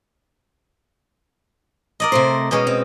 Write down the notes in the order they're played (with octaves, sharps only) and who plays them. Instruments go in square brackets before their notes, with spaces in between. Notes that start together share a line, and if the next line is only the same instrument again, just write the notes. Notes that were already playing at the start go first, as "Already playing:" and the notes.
[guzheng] A#4 D5 D#5
[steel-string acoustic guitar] C3 A3 C5
[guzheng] B2 G#3 C#4
[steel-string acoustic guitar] C4